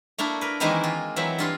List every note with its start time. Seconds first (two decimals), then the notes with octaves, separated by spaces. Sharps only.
0.18 A3 A#3 D4 E4
0.41 A#4 B4
0.60 D#3 E3 G#3 A#3 C4 E4
0.83 F4
1.16 E3 F#3 C4 E5
1.38 G2 F4 C6